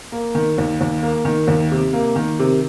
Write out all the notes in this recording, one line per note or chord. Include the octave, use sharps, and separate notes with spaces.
A#3
D#3
D#2
D#2
A#3
D#3
D#2
C3
A#3
D#3
C3